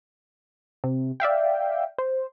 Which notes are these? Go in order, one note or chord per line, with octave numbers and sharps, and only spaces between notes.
C3
D5 E5 F5 G5
C5